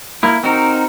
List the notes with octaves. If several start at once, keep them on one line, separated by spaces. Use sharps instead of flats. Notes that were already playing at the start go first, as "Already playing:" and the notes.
A#3 E4
C4 D#4 F#4 A#4